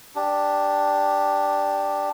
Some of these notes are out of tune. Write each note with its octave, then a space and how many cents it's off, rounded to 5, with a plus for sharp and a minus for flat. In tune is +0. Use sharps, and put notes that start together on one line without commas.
D4 +0 G4 +5